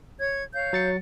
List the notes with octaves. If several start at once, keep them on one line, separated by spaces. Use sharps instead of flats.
C#5 G#6
C#5 F5 G6
F#3 A6 C#7